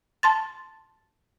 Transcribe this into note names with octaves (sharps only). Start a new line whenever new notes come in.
A5 C6 A6